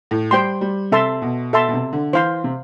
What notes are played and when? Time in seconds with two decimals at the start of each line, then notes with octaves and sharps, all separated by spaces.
0.11 A2
0.31 G3 C5 G5 C6
0.61 G3
0.91 C3 A4 E5 A5 C6
1.22 B2
1.53 B2 A4 E5 A5 C6
1.69 B2
1.74 C3
1.93 D3
2.13 E3 C5 F5 C6
2.44 C3